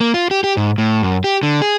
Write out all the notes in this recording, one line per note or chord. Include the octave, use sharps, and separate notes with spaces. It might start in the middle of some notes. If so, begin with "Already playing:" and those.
A#3
F4
G4
G4
G#2
A2
F#2
G4
D3
G#4